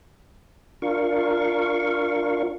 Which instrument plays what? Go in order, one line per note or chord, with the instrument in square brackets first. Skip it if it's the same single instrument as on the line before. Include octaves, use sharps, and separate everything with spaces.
[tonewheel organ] D4 F4 A#4 F5 C#6